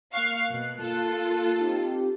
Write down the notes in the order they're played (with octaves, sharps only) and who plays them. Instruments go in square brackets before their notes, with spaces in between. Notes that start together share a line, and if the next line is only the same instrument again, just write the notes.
[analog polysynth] A#3 F#6 [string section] F5 C#6
[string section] B2
F4 A4
[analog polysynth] C4 D#4 G4